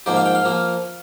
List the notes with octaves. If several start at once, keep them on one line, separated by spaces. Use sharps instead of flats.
G#2 F3 A#3 G4
F5
G5
F5
F3 A#3